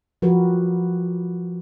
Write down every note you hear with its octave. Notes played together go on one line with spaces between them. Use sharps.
F3 F#4 G4 A#4 B4